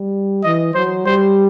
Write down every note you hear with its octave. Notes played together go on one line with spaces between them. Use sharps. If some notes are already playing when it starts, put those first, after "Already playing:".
Already playing: G3
E3 D#5
F#3 C5
G3 C5